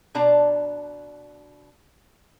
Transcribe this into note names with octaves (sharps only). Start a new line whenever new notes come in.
B2 D4 D5 A5 A#5